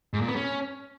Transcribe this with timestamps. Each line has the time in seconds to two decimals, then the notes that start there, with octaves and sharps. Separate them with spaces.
0.13 G#2
0.21 A#2
0.29 B3
0.36 C#4